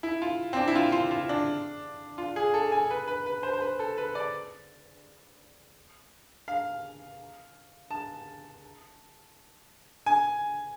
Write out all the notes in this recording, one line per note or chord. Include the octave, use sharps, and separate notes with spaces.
E4
F4
C4
D4
E4
F4
F4
F4
D4
F4
G#4
A4
G#5
B4
B4
B4
C5
C5
B4
A4
B4
D5
F5
A5
G#5